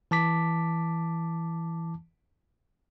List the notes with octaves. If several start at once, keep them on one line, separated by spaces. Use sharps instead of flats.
E3 A5 D6 B6